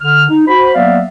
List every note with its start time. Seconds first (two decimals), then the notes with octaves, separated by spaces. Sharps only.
0.02 D3 F6
0.30 D#4
0.47 F#4 C5 B5
0.75 F#3 A#3 B3 D5 E5 F5